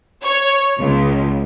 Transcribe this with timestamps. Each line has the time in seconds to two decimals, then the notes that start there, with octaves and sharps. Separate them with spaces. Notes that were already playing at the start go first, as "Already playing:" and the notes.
0.23 C#5
0.78 C#2